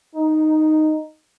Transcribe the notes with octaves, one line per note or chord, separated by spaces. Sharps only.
D#4